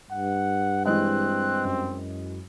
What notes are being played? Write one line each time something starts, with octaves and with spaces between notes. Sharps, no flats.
G2 F#5
E3 G#3 C4 D#5 F#6
F#2